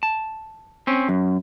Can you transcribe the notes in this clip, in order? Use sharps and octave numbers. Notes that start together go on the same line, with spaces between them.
A5
C4 C#4
F#2